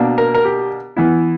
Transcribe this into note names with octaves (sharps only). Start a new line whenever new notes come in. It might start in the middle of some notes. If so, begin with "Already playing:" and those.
Already playing: B2 A#3 D4
A#4
A#4
G4
E3 B3 E4